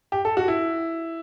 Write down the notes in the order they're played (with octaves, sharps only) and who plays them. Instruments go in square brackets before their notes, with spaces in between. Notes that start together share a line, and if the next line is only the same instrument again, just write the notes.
[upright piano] G4
A4
F#4
E4